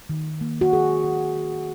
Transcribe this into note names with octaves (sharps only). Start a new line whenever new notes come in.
D#3
A#3
F#4
A#3 G#4
D#3
D#3